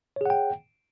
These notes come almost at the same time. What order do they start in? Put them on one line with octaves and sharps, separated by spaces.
C#5 G#4 F#5 G5